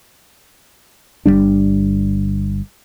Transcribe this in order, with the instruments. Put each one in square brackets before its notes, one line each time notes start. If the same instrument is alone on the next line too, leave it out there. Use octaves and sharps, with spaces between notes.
[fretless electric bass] G1 G#2 G3 D4